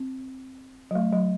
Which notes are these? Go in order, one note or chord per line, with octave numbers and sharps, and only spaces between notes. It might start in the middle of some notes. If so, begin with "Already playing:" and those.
Already playing: C4
F#3
A3
F#3